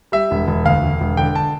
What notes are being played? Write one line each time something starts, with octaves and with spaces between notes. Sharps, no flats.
G3 E5
E1
E1
D2 F5
E1
E1
D3 G5
A5